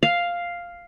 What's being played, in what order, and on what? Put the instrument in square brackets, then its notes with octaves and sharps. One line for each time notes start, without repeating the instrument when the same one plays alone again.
[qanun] F5